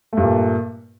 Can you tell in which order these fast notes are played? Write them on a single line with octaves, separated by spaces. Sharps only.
A3 G2 A#2